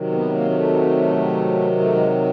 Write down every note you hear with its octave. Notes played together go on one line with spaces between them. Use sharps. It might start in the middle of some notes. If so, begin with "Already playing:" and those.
Already playing: C3 D#3 F#3
B3
A#3
A#3
A3
A3
G#3